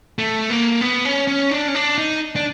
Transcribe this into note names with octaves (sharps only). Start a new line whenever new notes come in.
A3
A#3
B3
C#4
C#4
D4
C#4
D4
D#4
D4